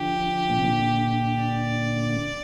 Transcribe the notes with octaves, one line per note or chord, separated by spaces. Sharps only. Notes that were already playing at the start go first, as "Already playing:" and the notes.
Already playing: D3 F3 G4
A#2
C3
A#2 D3
D5